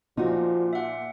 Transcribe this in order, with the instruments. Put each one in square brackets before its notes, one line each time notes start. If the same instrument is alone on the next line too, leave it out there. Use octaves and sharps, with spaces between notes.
[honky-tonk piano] A#2 [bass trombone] F3 [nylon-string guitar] D#4 F#4
[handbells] E5 F#5